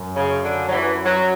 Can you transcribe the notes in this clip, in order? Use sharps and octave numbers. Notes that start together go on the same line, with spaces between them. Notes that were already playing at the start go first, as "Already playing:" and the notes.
Already playing: F#2
C#3
D3
F#3
E3
F#3